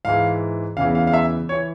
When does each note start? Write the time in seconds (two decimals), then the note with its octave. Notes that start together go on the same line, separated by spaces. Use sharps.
0.05 G#2 E3 F5
0.77 E2 C#3 E3 F5
0.95 F5
1.07 F5
1.13 E5
1.49 C#5
1.52 E3